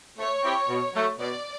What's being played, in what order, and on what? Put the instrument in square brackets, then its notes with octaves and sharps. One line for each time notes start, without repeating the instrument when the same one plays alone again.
[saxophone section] A3 [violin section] C#5
[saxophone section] C4 E4 G4
B2
F#3 A3
[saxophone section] B2 [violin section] D5